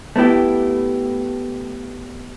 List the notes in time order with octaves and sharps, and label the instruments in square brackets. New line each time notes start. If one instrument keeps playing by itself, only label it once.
[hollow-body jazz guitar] A3 B3 E4 G4